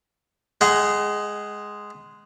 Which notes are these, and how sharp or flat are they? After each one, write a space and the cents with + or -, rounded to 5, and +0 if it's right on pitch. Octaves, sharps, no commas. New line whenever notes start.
G#3 +0 F#5 +35